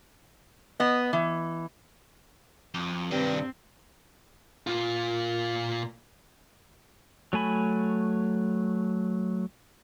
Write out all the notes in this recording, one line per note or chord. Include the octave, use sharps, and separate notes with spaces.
B3 D#5
E3
F2
C2 G2 D#3 C4
A#2 F4
F#3 A3 G#5 B5